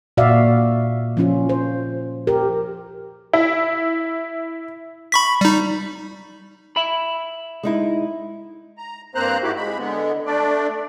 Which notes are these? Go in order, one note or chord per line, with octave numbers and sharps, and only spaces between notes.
A#2 F#4 D5 E5 F5
F3 C#4 F4
C5
G4 A#4
E4
B5 C#6 B6
G3 D#4
E5 B5
G#3 D#4 E4
A#5
G2 A#3 C4 C5 A#5 F#6
G#2 E4 F#4 G4
G#3 B5
D3 G#3 B3
A3 D4 D5